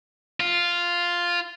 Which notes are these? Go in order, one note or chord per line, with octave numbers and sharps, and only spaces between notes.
F4